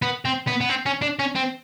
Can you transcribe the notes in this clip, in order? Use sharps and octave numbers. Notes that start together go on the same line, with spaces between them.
B3
C4
B3
B3
C4
C#4
D4
C#4
C4